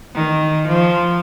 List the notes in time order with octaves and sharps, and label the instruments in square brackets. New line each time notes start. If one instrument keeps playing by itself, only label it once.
[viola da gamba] D#3
F3